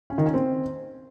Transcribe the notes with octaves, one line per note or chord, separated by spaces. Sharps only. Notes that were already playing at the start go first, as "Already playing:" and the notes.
C#4
D#3
C#4
C4